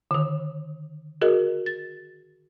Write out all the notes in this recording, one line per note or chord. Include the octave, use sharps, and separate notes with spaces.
D3 D#3
F#4 G#4 A#4 D#5
A6